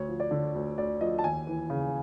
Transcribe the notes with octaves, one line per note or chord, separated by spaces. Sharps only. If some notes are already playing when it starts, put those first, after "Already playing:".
Already playing: D2 C#5
F3
D5
D3
D2
D2 D5
F3 D#5
A5
D#2 G#5
E3
C#3